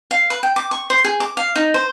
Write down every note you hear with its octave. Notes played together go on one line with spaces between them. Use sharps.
F5
B4
G5
D6
C#6
C5
G#4
D6
F5
D#4
C5